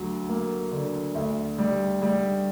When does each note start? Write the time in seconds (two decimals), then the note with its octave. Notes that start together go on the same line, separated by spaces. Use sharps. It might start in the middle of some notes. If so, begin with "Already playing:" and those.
Already playing: D2 F#3
0.29 A#3
0.72 D3
1.15 D2
1.59 G3
2.02 G3